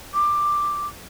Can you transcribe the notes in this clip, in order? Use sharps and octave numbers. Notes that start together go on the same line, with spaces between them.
D6